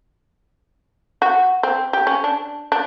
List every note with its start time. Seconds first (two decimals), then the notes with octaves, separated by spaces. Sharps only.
1.22 F#4
1.63 C4
1.93 G4
2.07 C#4
2.24 D4
2.72 D4